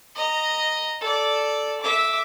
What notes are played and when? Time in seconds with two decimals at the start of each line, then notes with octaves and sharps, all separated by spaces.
0.15 D#5 A#5
1.01 A4 D5
1.81 E5 D6